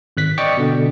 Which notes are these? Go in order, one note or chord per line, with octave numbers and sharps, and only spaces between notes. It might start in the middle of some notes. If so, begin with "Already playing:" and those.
G#1 F#6 B6
D5 D#5 G5 C#6 D6 C#7
B2 D3